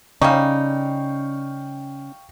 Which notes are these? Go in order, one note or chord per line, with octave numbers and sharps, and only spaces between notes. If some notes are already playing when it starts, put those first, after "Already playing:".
C#3 G3 C#4 D#4 F5 G5 C#6